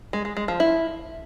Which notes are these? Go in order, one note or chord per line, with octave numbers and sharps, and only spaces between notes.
G#3
G#3
G#3
F3
E4